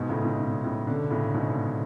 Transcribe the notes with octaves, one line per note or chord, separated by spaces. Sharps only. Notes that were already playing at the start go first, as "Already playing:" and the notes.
Already playing: G#2 B2
A2 C#3
G#2
A2 C#3
B2 D3
A2 C#3
G#2 B2